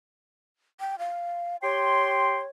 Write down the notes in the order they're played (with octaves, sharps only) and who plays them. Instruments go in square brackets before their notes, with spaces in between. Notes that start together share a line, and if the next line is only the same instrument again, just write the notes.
[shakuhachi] G5
F5
[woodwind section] G4 G5 C6 [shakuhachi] C#5